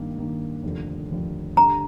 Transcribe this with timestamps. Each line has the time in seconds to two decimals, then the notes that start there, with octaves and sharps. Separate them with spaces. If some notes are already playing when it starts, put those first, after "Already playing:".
Already playing: G2 D#3 A#3 D#4
0.17 G2 D#3 A#3 D#4
0.63 F1 D#2 D3 F3
1.10 F1 D#2 D3 F3
1.57 G2 D3 G3 A#5